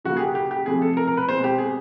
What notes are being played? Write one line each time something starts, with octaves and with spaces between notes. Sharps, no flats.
C#3 F#3 A#3 F#4
G#4
G4
G4
G4
C3 F3 A3 C4 G#4
A4
A#4
A#4
B4
B2 G#3 C4 C5
G4
G#4